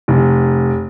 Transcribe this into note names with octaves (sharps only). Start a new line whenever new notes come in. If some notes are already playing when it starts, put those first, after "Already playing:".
F1